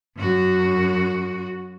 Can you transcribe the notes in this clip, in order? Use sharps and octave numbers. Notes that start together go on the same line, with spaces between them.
F#2 F#4